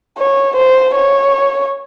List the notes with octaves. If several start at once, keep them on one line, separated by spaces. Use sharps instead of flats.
C#5
C5
C#5